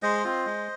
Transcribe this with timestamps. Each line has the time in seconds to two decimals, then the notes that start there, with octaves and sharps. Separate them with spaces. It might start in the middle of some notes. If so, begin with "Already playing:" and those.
0.03 G#3 C5 D#5
0.24 C4 F4
0.46 G#3